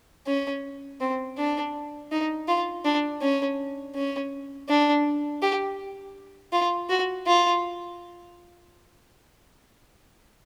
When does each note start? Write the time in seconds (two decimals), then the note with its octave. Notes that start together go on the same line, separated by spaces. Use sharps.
0.27 C#4
1.01 C4
1.37 D4
2.12 D#4
2.48 F4
2.85 D4
3.22 C#4
3.95 C#4
4.69 D4
5.42 G4
6.53 F4
6.89 F#4
7.26 F4